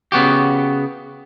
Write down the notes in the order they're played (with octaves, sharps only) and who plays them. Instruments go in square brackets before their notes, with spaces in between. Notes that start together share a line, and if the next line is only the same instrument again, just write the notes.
[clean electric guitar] C#3 B3 F#4 G4